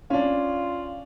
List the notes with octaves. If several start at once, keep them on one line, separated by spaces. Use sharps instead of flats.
C#4 D4 F4